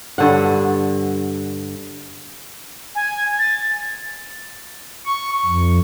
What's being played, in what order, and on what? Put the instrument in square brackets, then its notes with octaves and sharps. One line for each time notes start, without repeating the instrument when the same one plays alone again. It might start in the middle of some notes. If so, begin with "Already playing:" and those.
[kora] G2 D3 F#5
[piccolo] G#5
A6
[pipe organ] C#6
F2